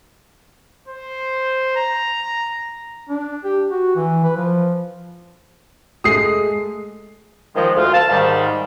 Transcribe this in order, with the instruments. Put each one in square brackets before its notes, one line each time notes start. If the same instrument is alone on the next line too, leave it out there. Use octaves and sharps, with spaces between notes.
[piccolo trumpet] C5
A#5
[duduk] D4
G4
F#4
E3
B4
F3
[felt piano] G#3 A3 [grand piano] D#6 C7
[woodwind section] D#3 F3 G#3
D2 F4
F5 A5
G#2 D#3 G3